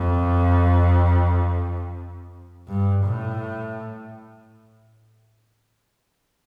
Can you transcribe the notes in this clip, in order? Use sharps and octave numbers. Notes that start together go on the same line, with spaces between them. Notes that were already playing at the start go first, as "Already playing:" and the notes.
Already playing: F2
G2
A2